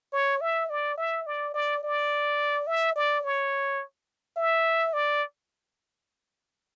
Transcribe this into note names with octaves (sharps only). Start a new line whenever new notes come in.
C#5
E5
D5
E5
D5
D5
D5
E5
D5
C#5
E5
D5